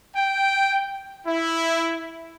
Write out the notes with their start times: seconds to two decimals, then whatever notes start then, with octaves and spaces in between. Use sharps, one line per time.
0.15 G5
1.25 E4